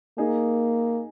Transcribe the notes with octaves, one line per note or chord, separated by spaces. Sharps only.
A#3 D#4 G#4